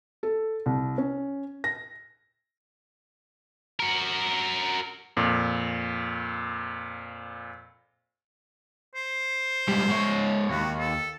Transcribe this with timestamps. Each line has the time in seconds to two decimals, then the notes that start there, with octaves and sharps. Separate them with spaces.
0.23 A4
0.66 C2
0.98 C#4
1.64 A#6
3.80 F#4 A#4
5.17 F2 A#2
8.95 C5
9.69 G#2 G3
9.88 G#2 C#5
10.50 D#2 F#4
10.79 A4